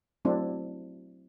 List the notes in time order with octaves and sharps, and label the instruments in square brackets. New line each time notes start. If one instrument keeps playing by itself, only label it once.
[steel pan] F#3 A3 C4 D4 E4